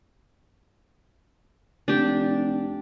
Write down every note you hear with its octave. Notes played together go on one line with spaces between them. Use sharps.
F1 D4 G4